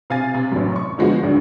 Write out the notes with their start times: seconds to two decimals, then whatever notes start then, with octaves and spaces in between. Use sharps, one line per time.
0.10 C3 F5 G#5 A6
0.34 C3
0.52 A1 F#2
0.76 C#6
0.98 D3 F3 G#3 B3 F#4
1.23 G#1 D2 G2